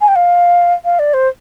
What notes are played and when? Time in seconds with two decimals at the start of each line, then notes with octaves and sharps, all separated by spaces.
0.01 G#5
0.08 G5
0.16 F5
0.85 F5
0.99 D5
1.14 C5